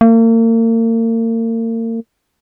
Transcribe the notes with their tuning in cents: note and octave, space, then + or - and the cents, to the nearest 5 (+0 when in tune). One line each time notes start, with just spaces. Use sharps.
A#3 -40